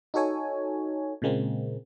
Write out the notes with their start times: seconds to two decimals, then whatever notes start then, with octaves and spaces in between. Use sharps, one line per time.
0.14 D#4 F#4 A4 C#5 G#5
1.22 A#2 C#3 G#3 A#3 C4